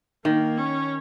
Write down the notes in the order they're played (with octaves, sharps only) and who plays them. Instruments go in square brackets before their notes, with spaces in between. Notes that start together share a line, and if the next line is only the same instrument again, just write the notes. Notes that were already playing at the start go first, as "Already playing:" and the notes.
[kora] D#3 [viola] A#3
[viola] C#4